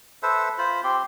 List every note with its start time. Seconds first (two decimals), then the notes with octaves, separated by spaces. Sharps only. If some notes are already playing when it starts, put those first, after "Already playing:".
0.23 A4 B4 C5 E5
0.58 F4 C5 B5
0.84 C4 G4 C6